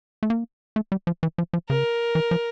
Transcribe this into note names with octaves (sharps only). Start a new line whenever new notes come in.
A3
A#3
A3
G3
F3
E3
F3
F3
C#3 A#4
E3
F3